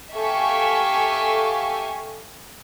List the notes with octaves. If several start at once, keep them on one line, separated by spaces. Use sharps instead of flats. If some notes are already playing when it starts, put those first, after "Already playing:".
G4 A4 E5 F5 G#5 C#6